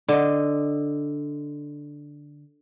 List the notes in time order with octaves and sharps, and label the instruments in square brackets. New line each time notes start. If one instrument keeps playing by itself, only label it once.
[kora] D3 D#5